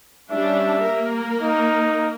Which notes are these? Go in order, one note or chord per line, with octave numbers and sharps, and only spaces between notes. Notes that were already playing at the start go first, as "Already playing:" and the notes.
G3 C#4 D4 E5
A#3 A#4
D#4